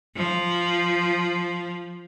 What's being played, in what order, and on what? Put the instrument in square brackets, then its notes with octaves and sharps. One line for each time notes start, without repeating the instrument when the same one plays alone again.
[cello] F3